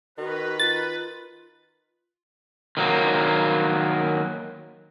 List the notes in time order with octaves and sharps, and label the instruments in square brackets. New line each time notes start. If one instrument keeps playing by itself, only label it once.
[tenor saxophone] D#3 [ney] F#4 [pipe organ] B4
[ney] F4 [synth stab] A6
[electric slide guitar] D#3 F#3 A#3